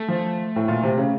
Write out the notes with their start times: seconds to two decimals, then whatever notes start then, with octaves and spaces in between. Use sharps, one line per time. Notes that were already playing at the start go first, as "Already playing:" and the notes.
Already playing: A3
0.08 F3
0.56 A2
0.68 A#2
0.83 C3
0.98 C#3